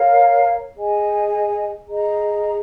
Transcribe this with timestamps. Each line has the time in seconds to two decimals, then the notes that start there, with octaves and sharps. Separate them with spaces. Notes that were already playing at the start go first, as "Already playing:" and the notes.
Already playing: A#4 C#5 F5 A#5
0.76 G#4 D#5 G#5
1.88 G#4 D#5 A#5